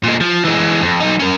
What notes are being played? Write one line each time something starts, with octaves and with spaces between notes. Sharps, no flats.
A#2 G#3
F3
E3 G#3
F2
F#3 D#4
C#4 A#4